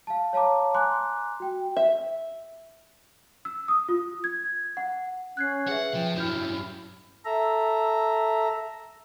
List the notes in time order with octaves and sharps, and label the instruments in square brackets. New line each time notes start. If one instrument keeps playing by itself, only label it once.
[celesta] F5 A5
C#5 F5 A5 A#5 D6
G#5 A#5 C6 D6 F#6
F#4 G5
[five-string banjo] E5
[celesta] E6
D#6
F4
G#6
F#5
[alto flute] C#4 [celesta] F#6 G#6 C7
[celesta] G#4 B4 E5 [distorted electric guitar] F#5
[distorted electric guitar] F3 [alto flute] G5
[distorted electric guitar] G2 F#3 [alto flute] E4 [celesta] F6 G6 E7
[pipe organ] A4 E5 A#5